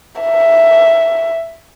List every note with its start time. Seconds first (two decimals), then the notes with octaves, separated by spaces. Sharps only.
0.21 E5